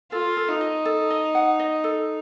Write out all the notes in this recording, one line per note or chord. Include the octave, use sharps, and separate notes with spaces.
F4 A4
A4
D#4
D#5
A4
D#5
F#5
D#5
A4